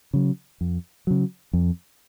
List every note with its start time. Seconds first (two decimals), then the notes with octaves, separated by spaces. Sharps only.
0.14 C#3 F#3
0.61 F2
1.07 C#3 F#3
1.53 F2